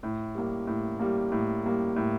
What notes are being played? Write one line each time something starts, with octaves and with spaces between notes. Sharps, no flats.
A2
G3 A#3
A2
G3 A#3
A2
G3 A#3
A2